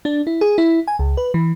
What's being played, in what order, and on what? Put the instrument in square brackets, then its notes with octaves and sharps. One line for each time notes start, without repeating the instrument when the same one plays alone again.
[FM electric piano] D4
E4
G#4
E4
G#5
C#2
B4
E3